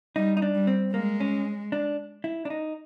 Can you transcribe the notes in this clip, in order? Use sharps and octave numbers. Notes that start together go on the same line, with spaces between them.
G3 D#4
D#4
D4
G3
C4
G#3 A#3
C#4
D4
E4
D4
D#4